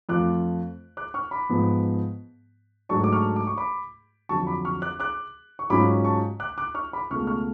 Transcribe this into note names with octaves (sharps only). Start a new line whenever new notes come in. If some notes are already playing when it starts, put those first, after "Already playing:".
F2 F3 A3 F4 D6 F#6
D6 F#6
C#6 F6
B5 D6
G#2 F3 B3
G#2 F#3 A3 D4 A5 C#6
D6
C#6 F6
D6
C#6
B5 D6
F2 D3 F#3 A5 C#6
B5 D6
C#6 F6
D6 F#6
D6 F#6
C#6
G#2 F#3 C#4 F4 B5 D6
A5 C#6
D6 F#6
D6 F#6
C#6 F6
B5 D6
C#2 B2 A3 C#6 F6
C#6 F6